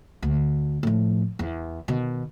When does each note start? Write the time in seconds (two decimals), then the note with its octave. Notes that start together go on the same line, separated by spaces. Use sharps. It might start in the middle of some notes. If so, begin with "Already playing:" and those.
0.22 D2
0.83 A2 F3
1.39 E2
1.88 B2 D#3